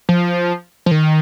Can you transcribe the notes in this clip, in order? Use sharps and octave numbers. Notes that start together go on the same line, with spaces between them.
F3
F3
D#3